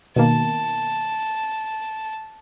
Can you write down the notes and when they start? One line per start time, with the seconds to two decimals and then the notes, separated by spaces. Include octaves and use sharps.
0.16 B2 D#3 A#3 A5